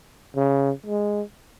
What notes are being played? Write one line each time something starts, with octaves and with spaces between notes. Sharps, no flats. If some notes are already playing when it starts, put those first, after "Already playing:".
C#3
G#3